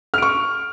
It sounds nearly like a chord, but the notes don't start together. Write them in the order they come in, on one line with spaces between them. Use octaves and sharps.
F6 D7 C#6